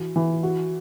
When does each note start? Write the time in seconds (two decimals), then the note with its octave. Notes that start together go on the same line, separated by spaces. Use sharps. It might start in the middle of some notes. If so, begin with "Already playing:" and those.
Already playing: E3 F#4
0.16 E3
0.43 F#4